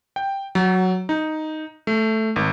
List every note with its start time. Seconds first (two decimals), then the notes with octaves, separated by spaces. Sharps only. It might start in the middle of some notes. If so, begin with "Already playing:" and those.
0.16 G5
0.55 F#3
1.09 D#4
1.87 A3
2.36 G#1